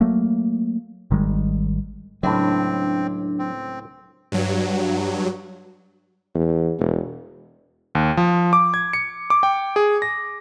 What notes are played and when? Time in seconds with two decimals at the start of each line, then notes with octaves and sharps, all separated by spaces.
0.01 F#3 A3 A#3
1.11 G#1 D#3 G3 G#3
2.23 C#2 A2 F#3 C4 D4
3.39 C4
4.32 G2 F#3
6.35 E2
6.79 E1
7.95 D#2
8.17 F3
8.53 D6
8.74 G#6
8.93 C#7
9.30 D6
9.43 G5
9.76 G#4
10.02 A#6